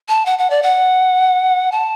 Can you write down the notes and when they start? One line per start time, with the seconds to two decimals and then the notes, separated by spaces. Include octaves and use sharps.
0.09 A5
0.26 F#5
0.39 F#5
0.50 D5
0.62 F#5
1.72 A5